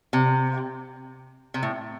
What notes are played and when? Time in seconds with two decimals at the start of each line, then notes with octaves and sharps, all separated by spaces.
0.13 C3
1.54 C3
1.63 A2